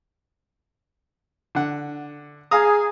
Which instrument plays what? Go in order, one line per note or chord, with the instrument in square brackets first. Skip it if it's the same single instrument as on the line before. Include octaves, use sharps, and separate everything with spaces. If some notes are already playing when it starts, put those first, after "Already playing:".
[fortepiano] D3 F#5
[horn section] G#4 [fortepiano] F5 A#5 D#6